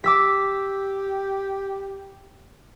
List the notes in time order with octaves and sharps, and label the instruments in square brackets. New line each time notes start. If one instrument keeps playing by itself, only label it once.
[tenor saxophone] G4 [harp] D6 E6 B6